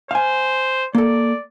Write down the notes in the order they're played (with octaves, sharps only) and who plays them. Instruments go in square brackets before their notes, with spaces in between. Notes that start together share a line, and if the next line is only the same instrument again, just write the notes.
[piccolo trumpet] C5 [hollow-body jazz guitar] F5 G#5
[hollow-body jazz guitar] A#3 A4 [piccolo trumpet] D5